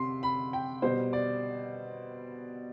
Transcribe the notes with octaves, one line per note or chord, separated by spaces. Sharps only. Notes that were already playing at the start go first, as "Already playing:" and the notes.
Already playing: C3 C6
B5
G5
B2 G3 C5
D5